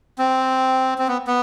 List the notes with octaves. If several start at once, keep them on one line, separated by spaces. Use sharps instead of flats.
C4
C4
B3
B3